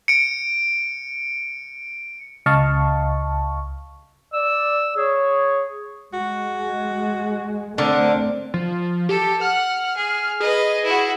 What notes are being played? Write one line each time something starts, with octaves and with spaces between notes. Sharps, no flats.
C#7 D7
C#2 D#5 F5 A5 C#6
D5 E6
G#4 C#5
G#3 F#4
D3 A3 C4 D4 A#4
F3
G4 A4
F#5 F6
G#4
G#4 B4 D#5
E4 F#4